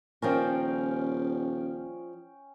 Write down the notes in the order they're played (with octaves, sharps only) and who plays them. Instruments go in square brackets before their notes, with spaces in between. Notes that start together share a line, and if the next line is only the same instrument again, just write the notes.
[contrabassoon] D#1 [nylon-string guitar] F3 D4 A#4 [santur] C#4 G5